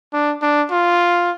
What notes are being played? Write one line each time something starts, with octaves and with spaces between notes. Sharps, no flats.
D4
D4
F4